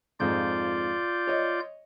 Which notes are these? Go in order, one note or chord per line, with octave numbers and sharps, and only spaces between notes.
F2 G#2 F4 D5 G6
C#5 D#5